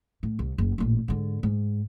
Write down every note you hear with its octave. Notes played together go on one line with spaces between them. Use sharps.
A2
C2
F#1
A1 A#2
G#2 D3
G#2